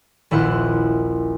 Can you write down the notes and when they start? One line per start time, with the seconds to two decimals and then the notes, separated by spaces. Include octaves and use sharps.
0.31 D#1 A#1 E4 F#5 C6 F6